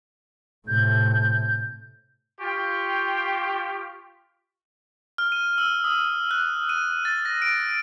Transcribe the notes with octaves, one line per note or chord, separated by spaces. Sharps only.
A2 C3 G6
F4 G4 G5 C#6
F6
D#7
E6
D#6
F#6
D#7
A6
A#6
D7